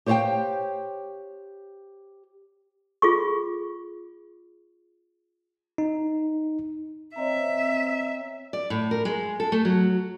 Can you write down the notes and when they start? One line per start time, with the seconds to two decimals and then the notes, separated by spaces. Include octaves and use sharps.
0.06 G4 C5 C#5 D#5 F5 G5
3.02 F4 G#4 C#6
5.78 D#4
7.16 C4 C#5 D#5 E5 A#5
8.53 D5
8.70 A2
8.91 A#4
9.05 G#3
9.40 A4
9.52 A3
9.65 F#3